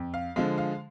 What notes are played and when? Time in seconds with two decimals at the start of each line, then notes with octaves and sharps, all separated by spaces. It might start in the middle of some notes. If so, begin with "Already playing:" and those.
Already playing: F2
0.14 F5
0.36 D3 F3 G#3 F5
0.58 F5